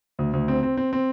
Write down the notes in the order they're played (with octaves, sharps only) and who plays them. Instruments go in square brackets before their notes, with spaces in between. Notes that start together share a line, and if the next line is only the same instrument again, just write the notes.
[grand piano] D2
D2
C4
C4
C4
C4